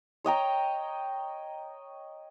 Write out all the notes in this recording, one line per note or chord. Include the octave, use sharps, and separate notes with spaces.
C#5 D#5 G5 A#5